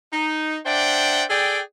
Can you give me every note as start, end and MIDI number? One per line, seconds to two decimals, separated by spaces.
0.13 0.58 63
0.65 1.23 62
0.65 1.23 72
0.65 1.23 74
0.65 1.23 76
0.65 1.23 78
0.65 1.23 79
1.30 1.60 68
1.30 1.60 69
1.30 1.60 74
1.30 1.60 79